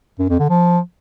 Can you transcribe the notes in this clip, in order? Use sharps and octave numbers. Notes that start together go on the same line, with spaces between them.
F#2
F2
D3
F3